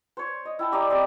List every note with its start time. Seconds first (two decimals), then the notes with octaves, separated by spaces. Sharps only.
0.17 C5 C#5
0.45 D#5
0.59 E4 G5 A5
0.72 G4 D5 D#5 A#5
0.90 G3 C4 D#5